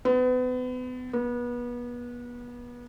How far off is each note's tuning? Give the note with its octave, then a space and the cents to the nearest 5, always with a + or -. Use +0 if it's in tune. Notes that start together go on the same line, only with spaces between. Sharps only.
B3 +35
B3 -30